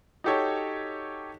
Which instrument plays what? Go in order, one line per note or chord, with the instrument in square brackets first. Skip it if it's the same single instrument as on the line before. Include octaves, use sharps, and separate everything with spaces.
[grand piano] D#4 F#4 G4 A4 C#5